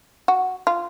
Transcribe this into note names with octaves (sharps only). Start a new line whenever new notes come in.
F#4
F4